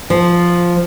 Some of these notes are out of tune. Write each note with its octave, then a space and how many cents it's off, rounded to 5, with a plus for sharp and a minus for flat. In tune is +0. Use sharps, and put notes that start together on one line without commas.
F3 +0